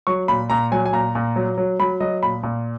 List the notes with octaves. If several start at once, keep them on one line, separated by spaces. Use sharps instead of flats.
F#3 C#6
A#2 B5
A#2 A#5
F#3 G#5
G#5
A#2 A#5
A#2
F#3
F#3
F#3 B5
F#3 D#5
A#2 B5
A#2